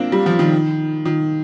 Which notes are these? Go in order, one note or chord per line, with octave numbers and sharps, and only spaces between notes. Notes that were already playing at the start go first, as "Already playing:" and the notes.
Already playing: A#3 C4 D4 F4
G3
F3
D#3
D#3